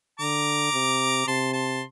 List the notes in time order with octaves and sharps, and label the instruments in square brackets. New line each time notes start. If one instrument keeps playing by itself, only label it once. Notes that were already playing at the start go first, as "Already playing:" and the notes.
[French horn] D3 [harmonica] A#5 D6
[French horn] C3
[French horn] C3 [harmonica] A5 C6
[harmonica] A5 C6